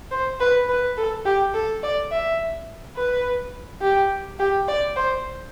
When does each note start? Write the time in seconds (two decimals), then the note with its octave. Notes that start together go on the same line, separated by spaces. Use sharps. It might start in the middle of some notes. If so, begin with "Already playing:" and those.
0.11 C5
0.40 B4
0.69 B4
0.97 A4
1.25 G4
1.54 A4
1.83 D5
2.11 E5
2.96 B4
3.82 G4
4.39 G4
4.68 D5
4.96 C5